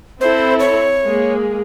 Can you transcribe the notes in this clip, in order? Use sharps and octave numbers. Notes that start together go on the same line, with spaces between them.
C4 E4 A4 C5
C#5
G#3 A#3 G#4